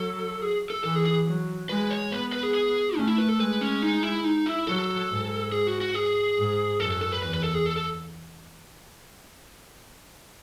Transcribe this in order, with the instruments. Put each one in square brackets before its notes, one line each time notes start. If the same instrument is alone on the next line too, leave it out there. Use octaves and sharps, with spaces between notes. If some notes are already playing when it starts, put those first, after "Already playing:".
Already playing: [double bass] F#3 [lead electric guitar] A4
[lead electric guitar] G#4
A4
[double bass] E3 [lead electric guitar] A4
[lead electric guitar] G#4
G#4
[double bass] F#3
[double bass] G#3 [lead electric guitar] B4
[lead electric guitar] C#5
[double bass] B3 [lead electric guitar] B4
[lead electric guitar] B4
G#4
G#4
[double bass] A3 [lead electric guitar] C#4
[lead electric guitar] E4
B4
A4
[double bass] G#3 [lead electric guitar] B4
[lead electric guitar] C#4
D#4
E4
D#4
E4
[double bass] F#3 [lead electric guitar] A4
[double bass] G#2
[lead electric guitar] G#4
F#4
F#4
G#4
[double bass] G#2
[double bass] F#2 [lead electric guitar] A4
[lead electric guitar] A4
A4
B4
[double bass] E2 [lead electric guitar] B4
[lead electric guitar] B4
A4
G#4
A4
A4